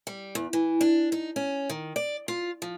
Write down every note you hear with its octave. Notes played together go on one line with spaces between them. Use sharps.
G3
E2
E3
D4
D#4
C#4
D#3
D5
F4
F3